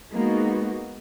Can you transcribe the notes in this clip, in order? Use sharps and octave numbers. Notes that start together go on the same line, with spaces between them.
G#3 A#3 B3 D#4 F#4